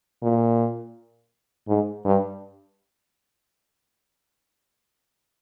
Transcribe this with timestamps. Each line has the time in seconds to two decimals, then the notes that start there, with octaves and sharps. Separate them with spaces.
0.23 A#2
1.68 G#2
2.05 G2